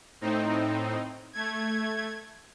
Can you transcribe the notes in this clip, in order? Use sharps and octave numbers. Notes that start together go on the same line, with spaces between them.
A2 C4 D#4
A3 G#6